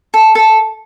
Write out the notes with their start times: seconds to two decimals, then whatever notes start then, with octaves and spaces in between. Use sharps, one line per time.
0.14 A4
0.35 A4